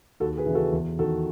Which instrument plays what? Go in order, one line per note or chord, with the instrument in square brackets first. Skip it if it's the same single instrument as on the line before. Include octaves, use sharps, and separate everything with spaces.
[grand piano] D#2 F#4 A4
G#4 B4
C#3 E3
F#4 A4
E2
D#3 F#4 A4